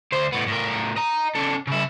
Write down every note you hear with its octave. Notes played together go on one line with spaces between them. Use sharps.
D2 C5
A2 B3
A2 A#4
D#5 A#5
C#3 A4
C#3 E4